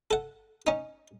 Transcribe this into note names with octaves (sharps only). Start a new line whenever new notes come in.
A4 F#5
C#4 D#4